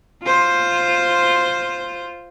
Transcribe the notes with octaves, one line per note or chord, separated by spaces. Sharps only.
F4 C5